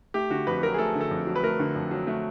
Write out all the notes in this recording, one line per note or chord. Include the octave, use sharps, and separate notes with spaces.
A3 G4
D3 F#4
F2 B4
F#3 A#4
G#4
A3 A4
D3
A4
F2
F#3
B4
A3 A#4
D3
F2
F#3
A3